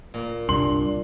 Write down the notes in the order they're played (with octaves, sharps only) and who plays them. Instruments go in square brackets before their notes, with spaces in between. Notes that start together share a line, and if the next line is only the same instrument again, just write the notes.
[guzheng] A#2
[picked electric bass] C2 G2 [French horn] D4 [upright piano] C6 F#7